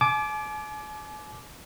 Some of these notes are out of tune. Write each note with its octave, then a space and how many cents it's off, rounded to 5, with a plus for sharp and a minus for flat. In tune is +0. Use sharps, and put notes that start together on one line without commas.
G#5 +45 D6 +0